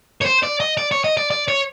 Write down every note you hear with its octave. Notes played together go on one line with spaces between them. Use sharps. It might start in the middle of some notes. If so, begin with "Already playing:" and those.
C#5
C5
D5
D#5
D5
C#5
D#5
D5
D5
C#5